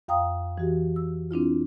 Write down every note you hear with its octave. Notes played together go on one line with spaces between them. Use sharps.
F2 F5 G5 A#5 D#6
E3 F#4 G4
E6
C4 D4 E4 F4